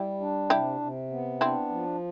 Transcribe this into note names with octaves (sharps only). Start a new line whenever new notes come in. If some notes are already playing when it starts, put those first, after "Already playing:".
Already playing: G3 E4 G4
D4
C3 E4 G4
C3
B3
C4 D4 E4
F3